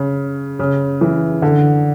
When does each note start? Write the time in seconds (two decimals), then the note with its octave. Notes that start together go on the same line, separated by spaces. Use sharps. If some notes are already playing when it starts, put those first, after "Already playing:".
Already playing: C#3
0.59 C#3
1.01 E3
1.42 D3